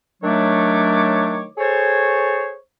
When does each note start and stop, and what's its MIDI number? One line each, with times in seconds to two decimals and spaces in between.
0.23 1.45 51
0.23 1.45 54
0.23 1.45 57
0.23 1.45 62
0.23 1.45 73
0.23 1.45 86
1.57 2.55 68
1.57 2.55 69
1.57 2.55 72
1.57 2.55 73